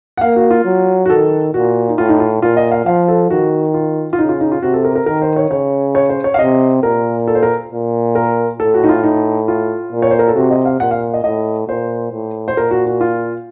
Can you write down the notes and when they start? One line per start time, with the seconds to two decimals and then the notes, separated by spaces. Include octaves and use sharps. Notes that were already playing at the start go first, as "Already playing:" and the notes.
0.17 F#5
0.21 A#3 F5
0.36 F#4
0.51 F4
0.65 F#3
1.06 F#4
1.10 D#3 A4
1.54 A#2 F#4
1.89 D#4
1.98 A2 F4
2.09 D#4
2.20 F4
2.42 A#2 F4
2.57 D#5
2.72 F5
2.86 F3 F5
3.08 A4
3.30 D#3 F#4
3.74 F4
4.13 F4
4.19 C#3 D#4
4.29 F4
4.41 D#4
4.52 F4
4.62 C3 F#4
4.74 A4
4.85 A#4
4.95 A#4
5.06 D#3 A#4
5.22 C5
5.36 C#5
5.50 C#3 C#5
5.95 C#5
6.09 C5
6.24 C#5
6.34 F5
6.39 C3 D#5
6.83 A#2 A#4
7.28 A4
7.35 C5
7.43 A#4
7.72 A#2
8.15 A#4
8.60 A2 A4
8.74 F#4
8.84 D#4
8.89 F4
9.03 D#4
9.48 F4
9.92 A#2
10.02 C#5
10.11 C5
10.19 A#4
10.28 A4
10.36 C3 F#4
10.51 D#5
10.65 F5
10.80 A#2 F#5
10.91 F5
11.14 D#5
11.24 A2 D#5
11.68 A#2 C5
12.12 A2
12.48 C5
12.57 A#2 A#4
12.71 F#4
12.86 F#4
13.01 F4